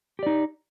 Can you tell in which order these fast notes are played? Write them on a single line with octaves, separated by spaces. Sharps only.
G4 D5 D#4